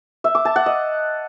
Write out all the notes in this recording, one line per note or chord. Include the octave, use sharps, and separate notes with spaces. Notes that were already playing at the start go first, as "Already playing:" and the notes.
E5
D6
A5
F#5
D#5